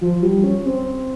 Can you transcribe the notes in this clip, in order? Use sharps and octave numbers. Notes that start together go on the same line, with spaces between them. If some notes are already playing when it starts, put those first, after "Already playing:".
F3
G3
C#4
C4